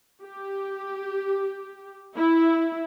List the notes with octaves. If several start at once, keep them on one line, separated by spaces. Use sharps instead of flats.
G4
E4